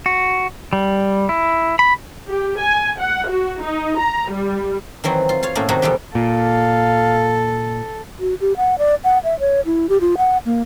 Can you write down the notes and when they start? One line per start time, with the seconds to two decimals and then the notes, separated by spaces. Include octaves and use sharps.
0.06 F#4
0.73 G3
1.29 E4
1.79 B5
2.27 G4
2.59 G#5
3.00 F#5
3.28 F#4
3.62 D#4
3.99 A#5
4.30 G3
5.04 D#3 E3 F#3 C4
5.29 F4
5.43 F4 C#5 F5
5.55 A2 A3 A#3 C#4
5.69 C3 D#3 F#3 A#3 D#4 F#4
5.82 F2 B2 E3 G3 G4
6.15 A#2 A4 F5
8.20 F#4
8.41 G4
8.57 F#5
8.78 D5
9.04 F#5
9.24 E5
9.40 C#5
9.66 E4
9.89 G4
10.01 F4
10.18 F#5
10.45 A#3